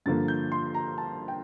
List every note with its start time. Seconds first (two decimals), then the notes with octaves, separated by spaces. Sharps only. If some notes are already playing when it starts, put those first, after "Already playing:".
0.06 G2 D3 F3 A#3 A6
0.28 G6
0.52 C6
0.74 A#5
0.98 A5
1.28 G5